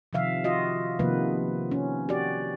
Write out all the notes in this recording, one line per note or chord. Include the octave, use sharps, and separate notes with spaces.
C3 D#3 F3 E5 F5
F4 F#4 D#5
C3 D#3 F3 A#3 B3 B4
C#4
F#4 G4 D5